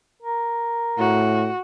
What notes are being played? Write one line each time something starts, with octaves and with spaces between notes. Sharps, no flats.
A#4
A2 F#4